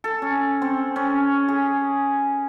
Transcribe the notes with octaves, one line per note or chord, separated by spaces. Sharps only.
A4
C#4
C4
C#4
G#4